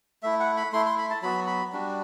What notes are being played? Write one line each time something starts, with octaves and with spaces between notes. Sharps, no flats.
A3 E4 E5
F#5
B5
A3 E4 C6
C6
B5
A5
F#3 B3 F#4 B5
B5
G3 D4 F#4